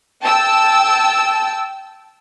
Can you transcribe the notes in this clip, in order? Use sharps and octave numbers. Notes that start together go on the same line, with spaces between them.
G5 A5 E6